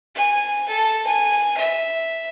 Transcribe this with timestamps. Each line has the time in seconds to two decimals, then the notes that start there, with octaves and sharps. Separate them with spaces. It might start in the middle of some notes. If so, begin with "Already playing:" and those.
0.15 G#5
0.69 A4
1.07 G#5
1.58 E5